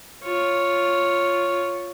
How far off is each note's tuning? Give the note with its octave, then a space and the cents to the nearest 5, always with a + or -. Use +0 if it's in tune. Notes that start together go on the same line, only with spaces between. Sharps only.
F4 +0 C#5 +0